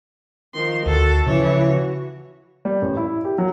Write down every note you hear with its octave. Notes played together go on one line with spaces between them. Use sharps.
D#3 F3 C6
D2 F#4 A4
C#3 E3 F3 E4 C#5
F#4
G3
A1
E4
G4
F#3